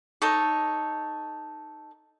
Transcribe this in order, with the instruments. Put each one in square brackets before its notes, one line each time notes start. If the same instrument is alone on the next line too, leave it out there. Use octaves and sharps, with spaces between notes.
[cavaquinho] D#4 A4 C#5